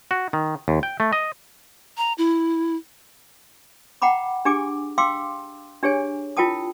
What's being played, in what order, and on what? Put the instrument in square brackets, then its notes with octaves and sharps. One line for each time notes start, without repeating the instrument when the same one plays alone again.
[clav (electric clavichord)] F#4
D#3
D#2
G5
A3
D#5
[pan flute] A#5
E4
[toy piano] F#5 G5 A#5 B5 D6
D4 G4 G#4 G#5 D6
F5 G5 C6 D6 E6
D4 G4 G#4 C#5 G#5
E4 F4 A#4 G5 A5 D#6